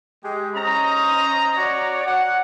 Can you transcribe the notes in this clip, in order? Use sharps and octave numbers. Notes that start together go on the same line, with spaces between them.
G#3 G4
C#4 C5 D#5 A#5
F#4 C#5 D5
F#5